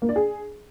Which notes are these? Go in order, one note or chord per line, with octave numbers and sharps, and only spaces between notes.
A#3
D5
G#4